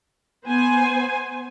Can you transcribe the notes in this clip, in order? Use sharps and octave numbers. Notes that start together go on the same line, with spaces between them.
B3 C5 G#5